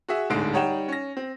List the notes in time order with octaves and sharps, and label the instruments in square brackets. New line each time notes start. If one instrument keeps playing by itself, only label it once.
[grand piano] F#4 G#4 E5
D1 D2 G#2 D3 C7 D7
G3 D#4 C#5 F#5 G5 E7
C#4 A#6
C4